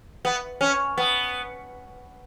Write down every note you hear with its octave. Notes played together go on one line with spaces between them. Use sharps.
B3
C#4
B3